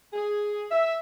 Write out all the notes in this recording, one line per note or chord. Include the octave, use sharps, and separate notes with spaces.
G#4
E5